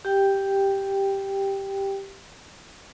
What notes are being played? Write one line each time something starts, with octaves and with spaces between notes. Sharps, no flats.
G4 G5